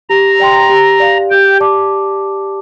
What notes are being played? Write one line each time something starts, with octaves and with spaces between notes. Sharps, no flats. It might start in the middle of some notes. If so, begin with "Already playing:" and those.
G4 A#5
D5 G5 C6
G4
D5 F5
G4 G5
D5 A5 D6